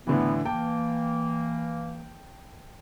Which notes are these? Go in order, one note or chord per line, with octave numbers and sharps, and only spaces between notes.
A2 D3 E3 B3
E3 A#3 G5 A5